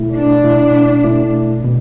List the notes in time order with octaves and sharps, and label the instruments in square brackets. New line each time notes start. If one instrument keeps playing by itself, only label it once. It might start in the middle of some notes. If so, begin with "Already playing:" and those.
Already playing: [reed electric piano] B2 A3 E4
[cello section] D4
[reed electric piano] B2 A3 E4
B2 A3 E4
B2